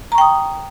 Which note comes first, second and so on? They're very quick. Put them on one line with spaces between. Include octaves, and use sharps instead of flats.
A#5 C#6 G5 D#6